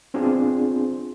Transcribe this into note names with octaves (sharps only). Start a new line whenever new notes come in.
B3 C4 D4 F4 G#4 C5